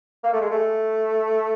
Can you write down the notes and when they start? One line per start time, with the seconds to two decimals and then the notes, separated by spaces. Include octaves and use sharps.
0.23 A#3
0.33 A3
0.41 G#3
0.51 A3